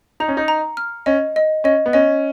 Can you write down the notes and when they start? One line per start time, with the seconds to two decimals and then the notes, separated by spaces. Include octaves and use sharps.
0.20 D#4 A#5
0.28 C#4
0.37 D#4
0.48 A#5
0.77 F6
1.06 C#4 D#5
1.36 D#5
1.64 C#4 D#5
1.86 B3
1.93 C#4 D#5